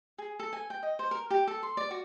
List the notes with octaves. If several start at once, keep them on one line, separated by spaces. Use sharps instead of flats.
G#4
A4
G#5
G5
D#5
C5
A#4
G4
A4
C6
D5
F#4